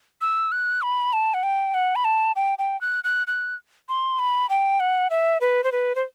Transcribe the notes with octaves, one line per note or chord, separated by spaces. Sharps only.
E6
F#6
B5
A5
F#5
G5
F#5
B5
A5
G5
G5
F#6
F#6
F#6
C6
B5
G5
F#5
E5
B4
C5
B4
C5